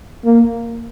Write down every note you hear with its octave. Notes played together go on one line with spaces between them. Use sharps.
A#3